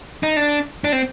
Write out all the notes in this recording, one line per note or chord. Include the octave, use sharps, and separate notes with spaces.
D#4
D4
D4
C4